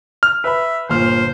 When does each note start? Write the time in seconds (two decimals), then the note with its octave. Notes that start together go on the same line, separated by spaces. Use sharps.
0.23 F6
0.44 B4 E5 B5
0.89 G1 A#2 C5 F6